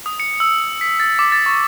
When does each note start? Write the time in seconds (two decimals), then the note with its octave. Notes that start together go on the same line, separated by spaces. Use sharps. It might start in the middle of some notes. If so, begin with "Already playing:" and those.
0.06 D#6
0.20 C#7
0.40 E6
0.81 B6
1.00 A6
1.19 D6
1.32 A6
1.46 C#6